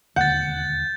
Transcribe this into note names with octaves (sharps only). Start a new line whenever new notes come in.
E1 D#2 D3 F#5 G6 A6